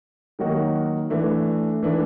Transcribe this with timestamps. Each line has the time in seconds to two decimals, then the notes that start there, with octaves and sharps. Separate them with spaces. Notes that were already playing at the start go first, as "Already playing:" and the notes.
0.39 D#3 F#3 A#3 D#4 F#4
1.10 E3 A3 D4
1.83 E3 A3 D4